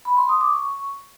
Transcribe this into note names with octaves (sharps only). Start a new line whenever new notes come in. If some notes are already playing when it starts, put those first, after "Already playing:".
B5
C6
D#6
D6
C#6